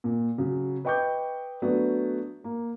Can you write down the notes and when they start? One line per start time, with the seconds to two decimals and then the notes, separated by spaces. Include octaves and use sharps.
0.04 A#2
0.38 C#3 F#3
0.85 B4 D#5 G5 C#6 D6 G6
1.62 F#3 A3 B3 D4
2.44 A#3